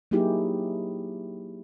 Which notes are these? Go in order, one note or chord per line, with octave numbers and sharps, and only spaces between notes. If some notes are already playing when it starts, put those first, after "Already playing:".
F#3 A#3 D#4 E4 G4 G#4